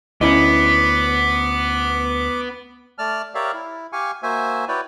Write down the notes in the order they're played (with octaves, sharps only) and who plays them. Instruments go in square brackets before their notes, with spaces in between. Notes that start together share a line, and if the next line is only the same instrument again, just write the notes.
[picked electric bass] D2 [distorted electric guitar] B3 [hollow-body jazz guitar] C#4 E4 D#5 [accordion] D6
[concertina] A3 D5 A5 F6
G4 A#4 C#5 D5 E5 F5
E4
G4 F5 G#5 C#6
A#3 F#4 C5 E5 G#5
E4 F#4 B4 C#5 D5 G5